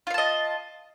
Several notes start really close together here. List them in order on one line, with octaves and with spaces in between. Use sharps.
F4 F5 A5 D#5